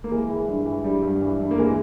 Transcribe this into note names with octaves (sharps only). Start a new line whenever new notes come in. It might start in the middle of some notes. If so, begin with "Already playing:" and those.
A#3
E3 G#3
E3
G2
E3
G2 G3
G2
E3
G2
A#3
E3 G#3